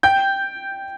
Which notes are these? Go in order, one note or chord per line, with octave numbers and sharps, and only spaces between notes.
G5 G6